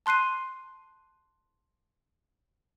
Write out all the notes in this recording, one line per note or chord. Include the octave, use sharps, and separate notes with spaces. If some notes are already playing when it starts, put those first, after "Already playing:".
A5 C6 F#6 C7 D#7